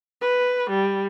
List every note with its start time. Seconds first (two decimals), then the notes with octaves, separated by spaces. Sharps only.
0.21 B4
0.70 G3